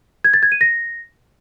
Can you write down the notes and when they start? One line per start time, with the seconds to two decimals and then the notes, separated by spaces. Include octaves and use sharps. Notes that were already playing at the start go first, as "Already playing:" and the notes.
0.24 G#6
0.34 A6
0.43 G#6
0.52 D#7
0.61 A#6